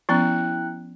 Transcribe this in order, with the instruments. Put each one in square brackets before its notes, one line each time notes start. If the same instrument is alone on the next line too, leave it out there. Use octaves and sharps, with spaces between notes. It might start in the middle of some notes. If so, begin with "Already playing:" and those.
[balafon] F3 B3 C#4 [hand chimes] E4 G5 F#6